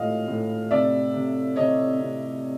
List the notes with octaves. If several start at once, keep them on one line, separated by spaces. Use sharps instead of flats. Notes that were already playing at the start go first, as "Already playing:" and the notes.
Already playing: A2 F3 G#3 D#5 F5
A2
C3 D5 E5
C3
C3 C#5 D#5
C3